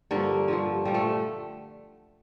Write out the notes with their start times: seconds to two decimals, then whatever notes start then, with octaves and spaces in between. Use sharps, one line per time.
0.11 G2 D3 F3 A#3
0.48 G2 D3 F3
0.85 A#2 F3 G3
0.94 A3